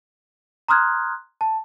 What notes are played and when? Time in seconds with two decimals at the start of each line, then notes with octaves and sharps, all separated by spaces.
0.68 A#5 C6 D#6 F6 F#6 G#6
1.41 A5